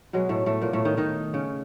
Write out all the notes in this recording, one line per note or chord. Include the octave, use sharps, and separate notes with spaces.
B2 F#3 G#3
A2 A3
A2 A3
A#2 A#3
A2 A3
D#3 D#4
D#3 D#4
C#3 C#4